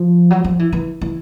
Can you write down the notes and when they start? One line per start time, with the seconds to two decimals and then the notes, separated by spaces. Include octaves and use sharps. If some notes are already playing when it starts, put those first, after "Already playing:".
Already playing: F3
0.30 F#3
0.44 F3
0.59 E3
0.72 E3
1.01 E3